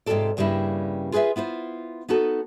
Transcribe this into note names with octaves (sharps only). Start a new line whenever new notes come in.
G#2 C3 G3 F4 A4 D5
G2 C#3 G3 A#3 E4
F4 G#4 B4 D5 E5
B3 E4 F4 C5
B3 D#4 F#4 A4